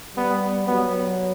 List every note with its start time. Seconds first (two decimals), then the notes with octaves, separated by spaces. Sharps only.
0.16 G3 B3
0.67 F#3 B3